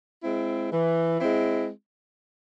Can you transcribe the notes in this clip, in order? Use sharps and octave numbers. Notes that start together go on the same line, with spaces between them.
G#3 C4 E4
E3
G#3 C4 E4